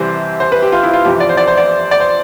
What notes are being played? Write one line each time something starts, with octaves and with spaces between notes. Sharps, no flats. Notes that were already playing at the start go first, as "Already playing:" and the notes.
Already playing: C2 C3 E3 G3 C5
C5
B4
G4
F4
E4
F4
G1 F2 C3 E3 G4
D5
C5
D5
C5
D5
D5
C5